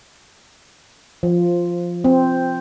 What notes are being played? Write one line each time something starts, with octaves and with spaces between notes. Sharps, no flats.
F3
C4